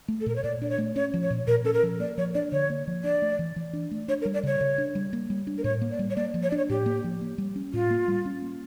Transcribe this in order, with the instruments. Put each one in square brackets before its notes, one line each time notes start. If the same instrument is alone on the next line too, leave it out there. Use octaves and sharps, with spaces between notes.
[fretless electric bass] A3
[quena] A4
[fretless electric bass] A#2 [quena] A#4
[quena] C#5
[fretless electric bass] A#2 [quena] D5
[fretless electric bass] D4 [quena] D5
[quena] C#5
[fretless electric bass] A3
[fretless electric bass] C#4 [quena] C#5
[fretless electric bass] F3
[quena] C#5
[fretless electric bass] A#2
[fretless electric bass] A#2 [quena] A#4
[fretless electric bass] C#4 [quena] A4
[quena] A#4
[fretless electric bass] F3
[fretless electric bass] A#3 [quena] D5
[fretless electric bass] F3 [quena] C#5
[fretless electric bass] D4 [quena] D5
[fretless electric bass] D3 [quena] C#5
[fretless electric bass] A#3
F3
[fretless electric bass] D4 [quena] D5
[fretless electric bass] A3
E3
E3
D4
A3
[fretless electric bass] D4 [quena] C#5
[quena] A#4
[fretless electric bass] G3
[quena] D5
[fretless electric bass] C#3 [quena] C#5
[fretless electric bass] C#3
D4
G3
A#3
G3
D4
[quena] A#4
[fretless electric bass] A2 [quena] C#5
[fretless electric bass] A#3
[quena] D5
[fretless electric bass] G3
[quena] C#5
[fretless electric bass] A#3 [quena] D5
[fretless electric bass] F3
[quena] C#5
[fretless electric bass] D4 [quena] D5
[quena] C#5
[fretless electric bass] A2 [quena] G4
[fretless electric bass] A#3
F3
A#3
G3
C#4
[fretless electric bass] A2 [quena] F4
[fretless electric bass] A#3
G3
C#4
A#3